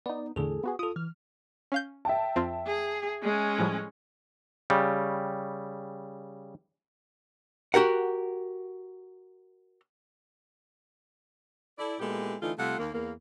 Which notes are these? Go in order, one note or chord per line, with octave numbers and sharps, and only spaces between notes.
B3 D#4 D5
E2 A2 D3 G#4 A4
B3 F#4 G#4
F4 A4 D#6
E3 F6
C#4 F5 G6
E5 G5 A5
F2 C4 F4
G#4
G#3 C#4
A2 F3 G3
C#3 G3
F#4 G4 A#4 F#5
E4 A4 D5
A#2 G#3 B3 E4 G4 A4
D3 E3 A3 C#4 D#4 F4
C3 G3 A3 F4 F5 F#5
D#2 A#3
E2 A#3